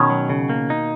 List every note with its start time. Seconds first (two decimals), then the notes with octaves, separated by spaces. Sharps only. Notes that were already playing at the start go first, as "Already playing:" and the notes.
Already playing: B2 D#3 C#4
0.10 F#3
0.30 C#3
0.50 A#3
0.70 D#4